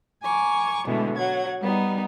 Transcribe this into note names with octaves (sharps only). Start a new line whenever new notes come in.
G#5 A#5 C#6 D6
B2 D3 E3 G#3 A3
F#3 F#5 G#6
G3 B3 D#4